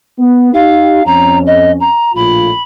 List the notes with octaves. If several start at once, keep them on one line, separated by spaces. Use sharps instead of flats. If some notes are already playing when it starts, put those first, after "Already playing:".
B3
D#4 G4 F5
F2 C#4 A#5
D#5
A#5
A#1 A2 F4 B5